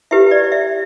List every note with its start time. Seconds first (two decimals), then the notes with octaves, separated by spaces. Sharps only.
0.11 E4 G4 B4 E5
0.31 D5
0.52 E5